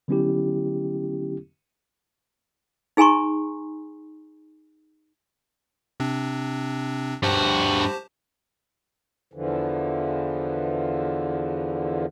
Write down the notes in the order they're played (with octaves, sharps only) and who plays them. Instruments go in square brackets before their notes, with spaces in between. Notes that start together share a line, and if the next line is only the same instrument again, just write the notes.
[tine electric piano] D3 F#3 B3 C#4 E4 G4
[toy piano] D#4 G#4 G#5 A#5 C6 C#6
[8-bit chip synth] C3 C4 D4
[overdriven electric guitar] G2 F#4 [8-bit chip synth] G4 C5 A5
[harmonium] E2 D3 E3 F3